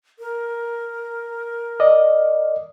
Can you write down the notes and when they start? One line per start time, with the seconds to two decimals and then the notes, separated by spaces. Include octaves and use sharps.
0.19 A#4
1.80 D5 D#5